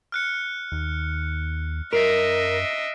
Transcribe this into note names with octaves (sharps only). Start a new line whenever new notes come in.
F6 F#6 C#7
D#2
F#2 A#4 D#5 E5 A#6 C7 D7